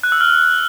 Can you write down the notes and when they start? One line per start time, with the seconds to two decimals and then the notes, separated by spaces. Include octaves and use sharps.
0.03 F#6
0.12 E6
0.21 F6